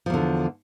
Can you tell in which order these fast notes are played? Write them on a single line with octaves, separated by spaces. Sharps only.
F3 E2 D3